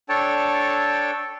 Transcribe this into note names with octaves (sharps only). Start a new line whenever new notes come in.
D4 A4 C#5 G5 A5